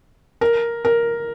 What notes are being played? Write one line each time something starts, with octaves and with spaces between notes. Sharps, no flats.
A#4
A#4